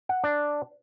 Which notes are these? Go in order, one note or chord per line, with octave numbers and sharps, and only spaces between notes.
F#5
D4